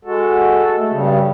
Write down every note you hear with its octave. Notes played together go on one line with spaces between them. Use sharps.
G#3 F#4 A4
A3
G2 C#3 G3